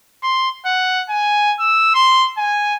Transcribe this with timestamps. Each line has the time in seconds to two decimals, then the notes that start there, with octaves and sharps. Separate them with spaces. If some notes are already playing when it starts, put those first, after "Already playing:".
0.23 C6
0.65 F#5
1.09 G#5
1.59 E6
1.95 C6
2.38 G#5